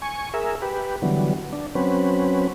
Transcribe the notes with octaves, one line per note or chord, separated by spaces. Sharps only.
G#5 C#6
G#4 A#4 E5
G4 B4
D3 E3 F#3 G3 B3
D4
F#3 C4 C#4 B4